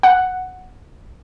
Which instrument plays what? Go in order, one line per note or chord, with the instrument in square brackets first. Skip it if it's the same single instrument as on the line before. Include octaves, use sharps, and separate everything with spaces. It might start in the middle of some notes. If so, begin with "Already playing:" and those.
[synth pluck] F#5